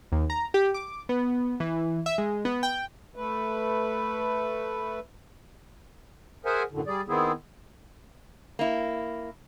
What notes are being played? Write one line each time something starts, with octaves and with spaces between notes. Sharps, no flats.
D#2
A#5
G4
D6
B3
E3
E5
G#3
B3
G5
A3 B4
G#4 A#4 C5 E5 F#5 G#5
F#2 A2 D3
G3 G#4 D5
D#3 B3 C4 E4 G#4
A#3 E4